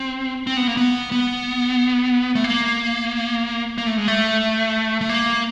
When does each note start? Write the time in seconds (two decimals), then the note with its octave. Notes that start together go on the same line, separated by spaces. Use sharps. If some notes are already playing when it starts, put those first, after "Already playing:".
Already playing: C4
0.47 C4
0.57 B3
0.68 A#3
0.77 B3
1.12 B3
2.35 A3
2.44 A#3
3.78 A#3
3.87 A3
3.98 G#3
4.08 A3
5.01 A3
5.09 A#3